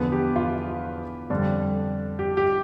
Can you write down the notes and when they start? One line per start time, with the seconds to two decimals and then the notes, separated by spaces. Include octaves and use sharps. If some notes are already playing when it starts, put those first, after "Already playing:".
Already playing: E2 D3 F3 B3 B4
0.12 G4
0.36 F4
1.30 F2 D3 G3 D4
2.19 G4
2.37 G4